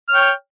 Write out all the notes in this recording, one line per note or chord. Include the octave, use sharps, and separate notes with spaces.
C#5 G5 F6